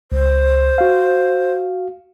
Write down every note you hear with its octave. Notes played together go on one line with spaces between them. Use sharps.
C#2 C5
F#4 F5